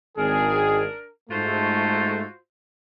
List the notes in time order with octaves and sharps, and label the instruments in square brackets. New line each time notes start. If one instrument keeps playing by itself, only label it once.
[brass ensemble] G#1 D#3 G#4 [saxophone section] D4 A#4
[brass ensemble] G#2 A3 [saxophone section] F4 F#4 C5